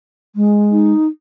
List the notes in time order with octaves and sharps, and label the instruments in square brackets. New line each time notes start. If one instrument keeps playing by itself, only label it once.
[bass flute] G#3
[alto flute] D#4